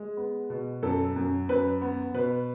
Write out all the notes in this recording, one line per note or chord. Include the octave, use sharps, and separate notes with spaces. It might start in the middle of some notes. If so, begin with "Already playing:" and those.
Already playing: G#3
B3
B2
F#2 A4
F#2
F#2 B4
B3
B2 B4